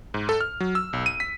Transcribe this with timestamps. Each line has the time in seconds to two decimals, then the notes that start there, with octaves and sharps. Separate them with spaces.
0.14 G#2
0.29 A4
0.41 F6
0.60 F#3
0.75 E6
0.93 B1
1.06 D#7
1.20 B6